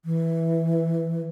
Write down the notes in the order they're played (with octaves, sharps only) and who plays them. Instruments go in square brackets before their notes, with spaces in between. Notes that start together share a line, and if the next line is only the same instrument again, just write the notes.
[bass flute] E3